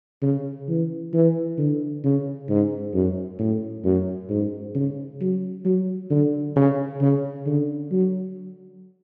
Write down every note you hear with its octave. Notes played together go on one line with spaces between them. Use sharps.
C#3
E3
E3
D3
C#3
G#2
F#2
A2
F#2
G#2
C#3
F#3
F#3
D3
C#3
C#3
D3
F#3